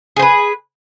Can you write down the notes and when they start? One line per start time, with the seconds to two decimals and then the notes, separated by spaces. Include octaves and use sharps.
0.16 G#4
0.19 C5
0.22 B4